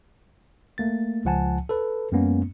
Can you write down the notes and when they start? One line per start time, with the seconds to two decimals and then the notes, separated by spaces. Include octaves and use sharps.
0.78 A3 A#3 A6
1.25 C#2 F3 F#5 G#5 A5
1.69 A4 B4
2.12 F#2 G#3 A#3 B3 C#4